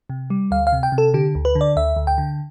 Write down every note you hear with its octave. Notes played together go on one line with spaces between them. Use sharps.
C3
G3
D2 F5
F5
C3
G5
C3
A4
D3 G4
D2
B4
D3
D5
D2 E5
D2
G5
D3